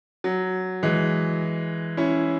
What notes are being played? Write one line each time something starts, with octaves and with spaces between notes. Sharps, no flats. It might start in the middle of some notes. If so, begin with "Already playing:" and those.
F#3
E3 G#3
C#4 E4